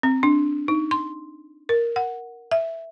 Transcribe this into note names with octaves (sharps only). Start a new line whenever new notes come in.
C4
D4
D#4
C6
A#4
F#5
E5